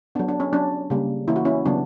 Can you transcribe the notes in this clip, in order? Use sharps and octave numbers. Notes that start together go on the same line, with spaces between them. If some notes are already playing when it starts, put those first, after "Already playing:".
F#3 B3 D4
D4
C#4
F#3 C#4 D4
C#3 G3 A#3
E3 A#3 C#4 E4
F#4
C#4 E4
C#3 F#3 B3 D4